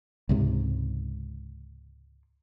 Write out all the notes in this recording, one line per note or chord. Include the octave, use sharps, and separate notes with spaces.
C#2 G#2 C3